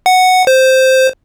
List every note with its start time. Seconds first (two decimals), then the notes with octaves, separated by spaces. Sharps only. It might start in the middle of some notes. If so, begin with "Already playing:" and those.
0.06 F#5
0.47 C5